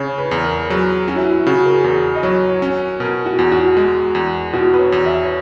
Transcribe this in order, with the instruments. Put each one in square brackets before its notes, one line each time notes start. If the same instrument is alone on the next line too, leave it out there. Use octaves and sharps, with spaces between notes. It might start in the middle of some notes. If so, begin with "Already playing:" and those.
Already playing: [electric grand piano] C#3 [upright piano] C#5
[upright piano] B4
[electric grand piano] E2
[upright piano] A#4
[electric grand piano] F#3 [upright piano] G#4
[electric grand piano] C#4 [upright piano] F#4
[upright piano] E4
E4
[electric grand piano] C#3 [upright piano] F#4
[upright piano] A#4
G#4
[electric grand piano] E2
[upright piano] D#5
[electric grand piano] F#3 [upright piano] C#5
[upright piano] C#5
[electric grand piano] C#4
[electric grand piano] B2 [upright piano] A#4
[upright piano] F#4
[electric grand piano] E2
[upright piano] F#4
[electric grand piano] G#3
E2
[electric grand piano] B2 [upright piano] F#4
[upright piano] B4
C#5
[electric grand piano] E2
[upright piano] E5
C#5